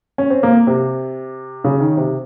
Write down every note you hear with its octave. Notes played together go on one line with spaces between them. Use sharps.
C#4
C4
A#3
C3
C#3
D#3
C3